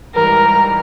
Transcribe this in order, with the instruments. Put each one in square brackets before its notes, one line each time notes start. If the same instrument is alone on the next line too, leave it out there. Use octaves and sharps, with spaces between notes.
[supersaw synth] G#2 E3 G3 [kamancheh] A#4